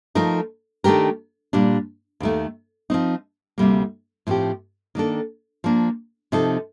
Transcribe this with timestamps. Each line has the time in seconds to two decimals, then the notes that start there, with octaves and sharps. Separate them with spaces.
0.15 F3 A3 D#4 A#4
0.84 D#3 A3 D4 G4 A#4
1.53 A#2 G3 D4
2.20 D#2 D#3 A3
2.90 F3 C4 D#4
3.58 D2 C3 G3 A#3
4.27 A2 F3 C4 G4
4.95 D#3 A#3 D4 A4
5.64 F3 A#3 D4
6.32 C3 F3 C4 D#4 A4